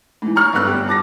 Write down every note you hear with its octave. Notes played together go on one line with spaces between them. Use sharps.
G#2 E3
A#5 C#6 F6
G1 G2 B3 E6 F#6
G3 G4
A5 D6 A6 A#6